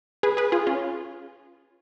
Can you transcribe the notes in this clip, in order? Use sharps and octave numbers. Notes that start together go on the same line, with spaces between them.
G#4 B4
G#4 B4
F4 G#4
C#4 F4